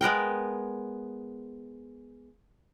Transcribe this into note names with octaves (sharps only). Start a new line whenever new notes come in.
G#3 B3 A#4 G5